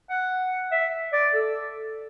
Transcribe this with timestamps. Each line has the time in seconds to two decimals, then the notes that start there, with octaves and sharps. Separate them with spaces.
0.10 F#5
0.72 E5
1.13 D5
1.33 A4